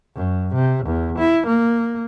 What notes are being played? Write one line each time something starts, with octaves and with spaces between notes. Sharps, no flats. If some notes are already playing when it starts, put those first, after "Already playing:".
F#2
C3
E2
E4
A#3